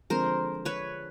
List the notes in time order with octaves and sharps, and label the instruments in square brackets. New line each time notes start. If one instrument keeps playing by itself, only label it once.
[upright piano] D3 F3 G#3 C4 [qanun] A#4 C5
[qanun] B4 C#5